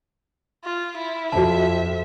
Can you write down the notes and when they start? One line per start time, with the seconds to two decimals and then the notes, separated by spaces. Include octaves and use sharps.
0.64 F4
0.97 E4
1.32 F2 F#4 E5 A5